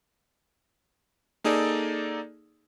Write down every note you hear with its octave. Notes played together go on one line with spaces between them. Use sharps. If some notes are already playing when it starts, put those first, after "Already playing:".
A#3 D#4 G#4 A4 D5